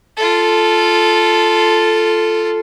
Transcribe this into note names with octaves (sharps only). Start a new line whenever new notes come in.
F4 A4